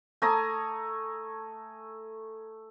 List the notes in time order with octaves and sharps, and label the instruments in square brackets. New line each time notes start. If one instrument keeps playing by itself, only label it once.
[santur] A3 G#5 A#5 D#6